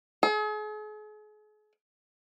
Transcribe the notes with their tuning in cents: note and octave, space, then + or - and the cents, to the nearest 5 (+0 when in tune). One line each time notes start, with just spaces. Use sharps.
G#4 +40